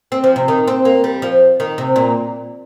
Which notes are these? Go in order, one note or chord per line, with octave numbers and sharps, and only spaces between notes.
C4
F3
C3
D#3
C4
A#3
G3
F3
D#3
C3
A#2